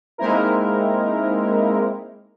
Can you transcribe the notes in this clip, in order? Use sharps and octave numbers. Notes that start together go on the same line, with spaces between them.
G#3 A#3 C4 D#4 E4 A#4